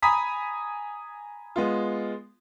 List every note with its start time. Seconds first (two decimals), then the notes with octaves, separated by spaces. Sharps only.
0.02 G#5 A#5 B5 D#6 B6
1.56 G#3 B3 F4